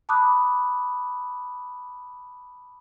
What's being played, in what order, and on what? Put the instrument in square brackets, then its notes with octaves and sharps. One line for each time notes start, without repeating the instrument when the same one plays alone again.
[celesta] A5 B5 D6 D#6 F#6